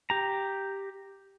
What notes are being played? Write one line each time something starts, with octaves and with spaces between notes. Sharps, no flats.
G4 A#5